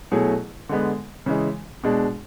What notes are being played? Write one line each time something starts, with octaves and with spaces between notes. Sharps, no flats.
B2 F#3 A3 E4 G#4
D3 G#3 B3
C#3 E3 G#3
B2 G#3 D4 G#4